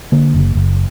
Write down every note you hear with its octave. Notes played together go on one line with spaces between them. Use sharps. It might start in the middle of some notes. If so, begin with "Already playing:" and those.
D3 A#3
F#1
F#1